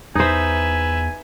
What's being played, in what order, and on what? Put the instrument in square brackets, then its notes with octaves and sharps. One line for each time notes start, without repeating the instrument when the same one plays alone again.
[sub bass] E2 [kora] D#4 C5 [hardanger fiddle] B4 E5 [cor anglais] G#5